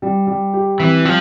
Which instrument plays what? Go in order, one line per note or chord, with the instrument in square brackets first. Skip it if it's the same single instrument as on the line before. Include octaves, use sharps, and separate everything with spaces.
[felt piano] G3
G3
G4
[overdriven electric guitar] E3 [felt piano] C4
[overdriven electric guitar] F3 [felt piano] G3